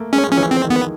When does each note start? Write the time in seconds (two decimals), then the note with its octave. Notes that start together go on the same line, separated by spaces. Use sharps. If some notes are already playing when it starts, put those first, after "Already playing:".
Already playing: A3 A#3
0.13 G#3 C#4
0.29 F3 C#4
0.38 E3
0.51 E3 C4
0.64 D#3
0.70 B3